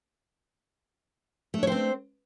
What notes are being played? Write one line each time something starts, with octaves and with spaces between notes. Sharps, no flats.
A3 C4 D4 C5 C#5